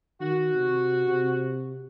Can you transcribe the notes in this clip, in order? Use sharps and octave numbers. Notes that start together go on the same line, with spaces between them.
D#3 F#4
C3
C3